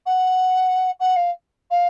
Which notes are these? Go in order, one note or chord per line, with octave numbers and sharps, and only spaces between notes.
F#5
F#5
F5
F5